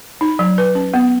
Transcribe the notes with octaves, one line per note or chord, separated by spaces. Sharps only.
D#4
F#3
B4
C#4
B3